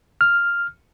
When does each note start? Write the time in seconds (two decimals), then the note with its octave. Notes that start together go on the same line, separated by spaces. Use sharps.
0.21 F6